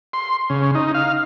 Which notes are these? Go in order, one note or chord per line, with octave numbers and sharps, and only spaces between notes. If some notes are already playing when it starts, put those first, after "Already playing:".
C6
C#3
D#4
F5